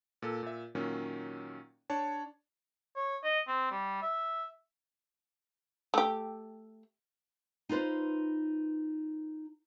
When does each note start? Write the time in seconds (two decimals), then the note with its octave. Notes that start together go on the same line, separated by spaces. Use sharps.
0.22 A#2 A4
0.43 A#2 E5
0.75 A#2 D#3 F#3 C#4
1.90 D4 C#5 A5
2.96 C#5
3.24 D#5
3.48 C4
3.71 G3
4.02 E5
5.94 A3 G4
7.69 D#4 F4 B4 C5